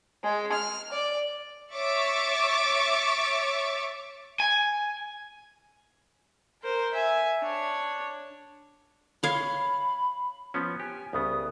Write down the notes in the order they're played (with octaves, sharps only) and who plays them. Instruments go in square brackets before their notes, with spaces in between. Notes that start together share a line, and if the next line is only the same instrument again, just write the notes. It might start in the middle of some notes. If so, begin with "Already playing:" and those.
[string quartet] G#3
F6
D5
[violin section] C#5 E5 C#6 D6 A6
[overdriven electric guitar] G#5
[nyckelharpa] A#4 C5
E5 G#5
D4 C#5
[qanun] C#5 F5 C6 [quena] B5
[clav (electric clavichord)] F3 B3 C#4
[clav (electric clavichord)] G4 [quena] G#5
[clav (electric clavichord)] C2 C#3 B3 [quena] D#6